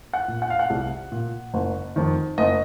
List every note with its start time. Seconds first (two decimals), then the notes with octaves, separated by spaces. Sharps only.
0.13 F#5
0.28 A#2
0.42 F#5
0.50 F5
0.59 F#5
0.70 C2
1.12 A#2
1.54 F#1
1.96 F2 D#3
2.38 F#1 D#5